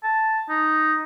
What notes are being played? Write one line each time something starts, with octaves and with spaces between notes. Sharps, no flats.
A5
D#4